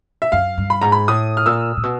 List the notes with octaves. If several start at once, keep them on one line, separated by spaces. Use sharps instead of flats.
E5
F#2 F5
G2
B5
G#2 A#5
B5
A2 D#6
F6
A#2 E6
A#2
B2